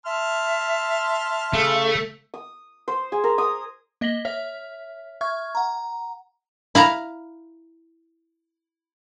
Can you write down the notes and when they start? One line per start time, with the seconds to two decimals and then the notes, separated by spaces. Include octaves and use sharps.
0.06 E5 A5 C6 F6
1.53 C#3 A3
2.34 D#6
2.88 C5
3.12 G#4
3.24 A#4
3.38 D#6
4.01 A#3 D#5 A#6 B6 F#7 G7
4.25 C#5 E5 F6 B6
5.21 E5 C#6 F6 G#6
5.55 F#5 A#5
6.75 E4 F5 A#5